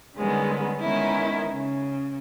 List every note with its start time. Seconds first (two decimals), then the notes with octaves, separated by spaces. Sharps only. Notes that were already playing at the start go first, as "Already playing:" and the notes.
0.16 D3 D#3 G3 G#3 B3 C#4
0.80 D#3 G#3 B3 C#4 D#4 E4
1.50 C#3